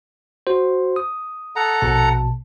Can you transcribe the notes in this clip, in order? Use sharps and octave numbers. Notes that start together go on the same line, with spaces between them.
F#4 C5
D#6
A4 F#5 A#5
A#1 B2 A5